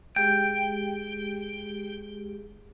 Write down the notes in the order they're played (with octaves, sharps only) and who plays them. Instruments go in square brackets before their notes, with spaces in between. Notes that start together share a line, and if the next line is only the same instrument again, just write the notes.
[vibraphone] G#3 G4 G#4 [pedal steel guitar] G5